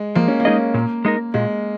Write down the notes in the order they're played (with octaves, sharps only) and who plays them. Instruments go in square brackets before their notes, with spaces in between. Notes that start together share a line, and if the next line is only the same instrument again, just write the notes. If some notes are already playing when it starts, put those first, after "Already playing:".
Already playing: [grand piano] G#3
[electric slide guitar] F3 [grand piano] A#3
[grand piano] C#4
A#3
[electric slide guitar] G#3 D#4 G#4 D#5
[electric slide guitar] A#2 [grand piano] A#3
[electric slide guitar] G#3 D#4 A#4
[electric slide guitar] A#2 [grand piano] G#3